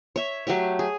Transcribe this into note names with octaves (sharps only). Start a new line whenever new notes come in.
C#5 E5
F#3 A3 G4 C#5
G#4